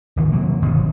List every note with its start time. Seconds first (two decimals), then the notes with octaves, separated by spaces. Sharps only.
0.16 D1 G#1 D#3 E3
0.32 C3 F#3 A#3
0.62 G1 D#2 B2